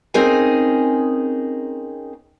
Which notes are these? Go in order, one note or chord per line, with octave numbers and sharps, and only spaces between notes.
C4 C#4 D#4 G#4 A#4 G#5